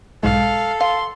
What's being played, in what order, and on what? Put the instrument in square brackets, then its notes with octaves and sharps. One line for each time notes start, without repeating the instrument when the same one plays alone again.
[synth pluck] B1 G#2 G#3 [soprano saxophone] A4 [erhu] F5
[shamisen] F5 [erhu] C6